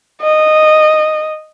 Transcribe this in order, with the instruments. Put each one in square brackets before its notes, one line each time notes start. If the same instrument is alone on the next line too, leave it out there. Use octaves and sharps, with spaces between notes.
[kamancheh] D#5